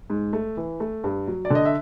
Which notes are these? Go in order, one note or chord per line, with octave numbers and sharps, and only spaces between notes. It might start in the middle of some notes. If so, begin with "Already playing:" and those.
G#2
A3
E3
A3
G2
F#3
D5
D3 D#5
E5